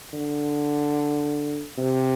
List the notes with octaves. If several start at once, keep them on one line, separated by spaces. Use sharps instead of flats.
D3
C3